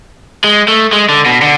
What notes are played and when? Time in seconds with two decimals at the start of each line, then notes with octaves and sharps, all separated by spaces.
0.44 G#3
0.68 A3
0.93 G#3
1.09 D3
1.26 B2
1.42 D3